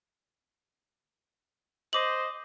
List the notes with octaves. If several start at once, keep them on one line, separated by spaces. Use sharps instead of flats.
C5 D#5 D6 F#7